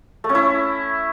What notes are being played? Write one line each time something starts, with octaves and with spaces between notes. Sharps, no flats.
A3
C#4
E4